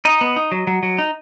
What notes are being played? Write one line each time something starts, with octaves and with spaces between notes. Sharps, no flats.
D#4 D#5
B3
D#4
F#3
F#3
F#3
D#4